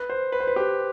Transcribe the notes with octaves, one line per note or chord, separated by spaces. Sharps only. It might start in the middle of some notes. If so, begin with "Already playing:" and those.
Already playing: B4
C5
B4
C5
B4
G4